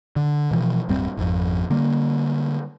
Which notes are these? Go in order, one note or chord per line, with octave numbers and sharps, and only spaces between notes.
D3
B2 E3 F3
D1 G2 G3 C4
G#1 F2
D3 G3 A#3